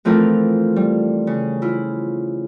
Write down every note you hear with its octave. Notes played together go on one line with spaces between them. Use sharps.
E3 F3 A3 C4 A4 A#4
G3
C#3
E4 F4